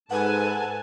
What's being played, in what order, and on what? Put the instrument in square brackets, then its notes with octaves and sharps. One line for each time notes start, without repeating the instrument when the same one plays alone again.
[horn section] G#2 [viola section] A4 G#5 A5 [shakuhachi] B4 [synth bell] F#5